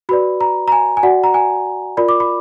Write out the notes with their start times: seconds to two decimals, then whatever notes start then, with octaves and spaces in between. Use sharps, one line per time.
0.09 F#4 B4 D5 B5
0.41 A#5
0.68 A#5
0.72 G#5
0.97 G#5
1.03 F#4 D5 F#5
1.24 A#5
1.34 G#5
1.97 F4 A#4 D5 B5
2.09 D6
2.20 B5